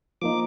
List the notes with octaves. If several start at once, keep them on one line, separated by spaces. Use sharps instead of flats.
F3 A#3 D#4 D6